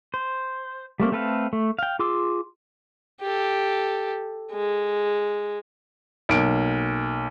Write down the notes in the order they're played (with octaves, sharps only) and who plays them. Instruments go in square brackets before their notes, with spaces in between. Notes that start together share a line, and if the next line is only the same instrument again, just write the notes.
[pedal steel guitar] C5
G3 A3 A#3 C4
A3 C4 A4 B4 F5
A3
F5 G5
F4 G#4 C6 D6 E6
[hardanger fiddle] G4 A4
G#3
[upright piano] B1 A#3 D7